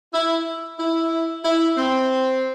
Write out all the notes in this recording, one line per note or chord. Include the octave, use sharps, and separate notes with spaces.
E4
E4
E4
C4